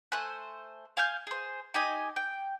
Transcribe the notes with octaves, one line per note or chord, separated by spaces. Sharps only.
A3 C5 G#5 F#6
F5 G#5 F6 G6
G#4 C5
D#4 G4 D#5 G#5
G5